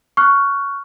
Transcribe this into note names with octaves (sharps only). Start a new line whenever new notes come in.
C#6 F6 F#6